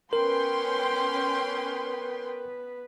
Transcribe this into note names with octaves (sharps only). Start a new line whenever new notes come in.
B3 C#4 A#4 B4 G5 C6